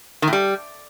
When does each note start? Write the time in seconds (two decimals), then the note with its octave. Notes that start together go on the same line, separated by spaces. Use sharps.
0.22 D#3
0.28 A2
0.33 G3